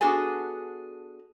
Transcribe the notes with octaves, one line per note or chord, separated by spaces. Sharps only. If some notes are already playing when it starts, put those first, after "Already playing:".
B3 D4 F#4 G#4 A4 G#5